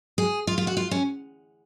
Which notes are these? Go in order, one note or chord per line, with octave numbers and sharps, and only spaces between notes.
G#4
F4
F4
F#4
F4
C#4